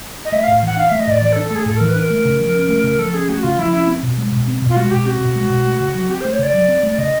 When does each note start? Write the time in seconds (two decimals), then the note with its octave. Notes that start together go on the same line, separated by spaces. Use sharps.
0.25 D#5
0.32 A3 E5
0.44 A2 F5
0.63 E3 F#5
0.77 D4 F5
0.89 A3 E5
1.00 D#5
1.07 A2 D5
1.21 E3 D5
1.32 D4 A4
1.47 A4
1.51 A3 G#4
1.66 A2 A4
1.76 E3 A#4
1.88 B4
1.96 D4 A#4
2.10 A3
2.25 C#3
2.40 F3
2.55 C#4
2.69 A3
2.84 C#3
2.99 F3 A4
3.14 C#4 G#4
3.29 A3 F#4
3.43 C#3 F4
3.58 F3 E4
3.72 C#4 E4
3.87 C4
4.03 B2
4.18 G#3
4.32 B2
4.47 C4
4.62 B2
4.69 F4
4.76 G#3 F#4
4.91 B2 G4
5.06 C4 F#4
5.21 B2
5.36 G#3
5.50 B2
5.65 A3
5.80 C#3
5.95 F#3
6.09 C4 G4
6.21 A3 C5
6.32 C#5
6.39 C#3 D5
6.54 F#3
6.68 C4
6.83 A3
6.98 C#3 D#5